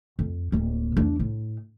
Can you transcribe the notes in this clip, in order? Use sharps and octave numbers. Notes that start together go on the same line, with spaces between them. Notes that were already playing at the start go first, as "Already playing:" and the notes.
F2
D1 A#3
E2 D4
A2